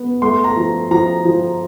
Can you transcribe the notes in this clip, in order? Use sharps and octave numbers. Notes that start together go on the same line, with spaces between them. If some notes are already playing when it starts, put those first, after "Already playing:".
Already playing: B3
A3 C6
A#5
F3
F3 A#5
F3